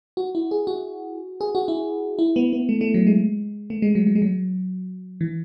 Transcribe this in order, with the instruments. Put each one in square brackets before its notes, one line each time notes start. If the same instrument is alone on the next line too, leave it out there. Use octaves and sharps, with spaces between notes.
[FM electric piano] F#4
E4
G#4
F#4
G#4
F#4
E4
E4
B3
B3
A3
A3
F#3
G#3
A3
G#3
F#3
F#3
G#3
F#3
E3